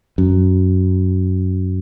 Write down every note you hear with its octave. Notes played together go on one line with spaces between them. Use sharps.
F#2